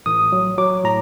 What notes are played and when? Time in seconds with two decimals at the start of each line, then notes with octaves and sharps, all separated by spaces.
0.06 A1 D#6
0.32 F#3
0.58 F#3 D6
0.84 A2 A#5